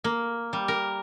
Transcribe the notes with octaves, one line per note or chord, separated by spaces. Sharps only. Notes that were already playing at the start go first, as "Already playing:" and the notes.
A#3
G3
A#4